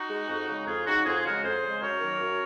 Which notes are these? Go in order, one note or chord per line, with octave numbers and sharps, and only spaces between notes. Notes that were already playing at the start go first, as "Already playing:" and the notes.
Already playing: D#4 F#4
G#3
F2
C#3 G#3
F2 F4 G#4
C#3 G#3 D#4 F#4
F2 F4 G#4
C#3 G#3 F#4 A#4
F2 G#4 C5
C#3 G#3
F#2 A#4 C#5
D#3 F#3 A#3
F#2